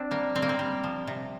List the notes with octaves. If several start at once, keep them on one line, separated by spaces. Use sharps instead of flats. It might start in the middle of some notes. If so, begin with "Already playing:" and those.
Already playing: C4 D4
G3 A#3
G3 C4
A#3
C4
G3
F3
C3